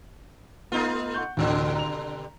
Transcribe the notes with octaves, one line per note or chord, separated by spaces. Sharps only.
A3 B3 D#4 F4
F#5 C#6 G6
A1 D2 G2 B2 D3
A#5 F7